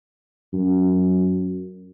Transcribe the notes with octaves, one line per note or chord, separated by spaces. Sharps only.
F#2